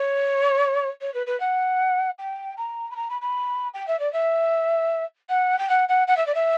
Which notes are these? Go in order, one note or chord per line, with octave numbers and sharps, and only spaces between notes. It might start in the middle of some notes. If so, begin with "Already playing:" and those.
Already playing: C#5
C#5
B4
B4
F#5
G5
A#5
B5
A#5
B5
B5
G5
E5
D5
E5
F#5
G5
F#5
F#5
F#5
E5
D5
E5